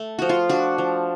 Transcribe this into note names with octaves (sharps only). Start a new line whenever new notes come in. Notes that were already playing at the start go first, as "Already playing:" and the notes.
Already playing: A3
F3 F#4
F4
D4 F#4
F3